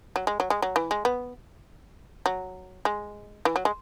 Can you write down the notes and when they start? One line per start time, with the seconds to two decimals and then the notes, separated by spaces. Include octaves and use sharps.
0.16 F#3
0.27 G#3
0.40 F#3
0.50 G#3
0.62 F#3
0.76 E3
0.91 G#3
1.05 B3
2.26 F#3
2.85 G#3
3.45 E3
3.56 F#3
3.65 G#3